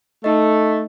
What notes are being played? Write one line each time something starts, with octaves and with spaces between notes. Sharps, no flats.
A3 D#4 D#5